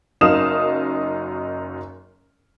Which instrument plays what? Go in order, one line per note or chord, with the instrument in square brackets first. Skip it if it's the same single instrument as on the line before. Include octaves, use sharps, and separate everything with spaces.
[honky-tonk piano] F#1 F#2 D#4 F5 D#6 E7